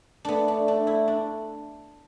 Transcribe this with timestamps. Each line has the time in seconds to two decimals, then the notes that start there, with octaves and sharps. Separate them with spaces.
0.25 A3 B3 D4
0.48 D4
0.68 D4
0.87 E4
1.08 D4